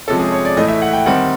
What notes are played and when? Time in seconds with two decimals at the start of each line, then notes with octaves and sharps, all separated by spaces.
0.07 C3 F3 G#3 C#4 A4
0.19 G#4
0.32 C#5
0.45 D5
0.57 A2 E3 A3 D#5
0.68 E5
0.82 F#5
0.93 G5
1.06 D#3 G3 C4 F#5